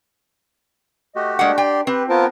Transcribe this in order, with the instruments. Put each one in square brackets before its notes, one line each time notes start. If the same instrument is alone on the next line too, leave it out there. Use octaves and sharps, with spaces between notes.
[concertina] A3 F#4 G4 [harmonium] D#5
[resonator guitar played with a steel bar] G#3 A#3 F#5 [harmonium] D4
[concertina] G4 D5 C6 [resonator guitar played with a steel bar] G5
[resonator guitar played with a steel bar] C4 [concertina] G4 [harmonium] B4
[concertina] B3 A#4 G5 [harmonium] F4 C5 A5